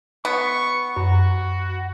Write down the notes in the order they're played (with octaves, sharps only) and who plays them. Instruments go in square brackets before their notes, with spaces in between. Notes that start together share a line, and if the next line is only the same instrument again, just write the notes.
[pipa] B3 [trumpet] C#6
[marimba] F#2 [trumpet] F#4